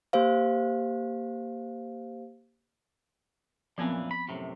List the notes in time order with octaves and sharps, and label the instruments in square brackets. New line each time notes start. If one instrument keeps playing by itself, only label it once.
[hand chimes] A#3 G4 C5 F5
[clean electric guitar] F#2 A#2 E3 [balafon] F3 B3 C4
[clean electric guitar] B5
F#2 A2 C3